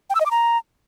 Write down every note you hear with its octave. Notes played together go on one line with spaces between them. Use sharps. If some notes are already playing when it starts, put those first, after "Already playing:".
G5
E6
D#5
D6
A#5